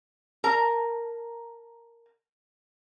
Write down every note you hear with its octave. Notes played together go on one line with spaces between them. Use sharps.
A#4 A5 A#5